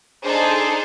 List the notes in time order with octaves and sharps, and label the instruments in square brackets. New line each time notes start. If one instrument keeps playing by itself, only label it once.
[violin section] D4 D#4 G#4 A4 C5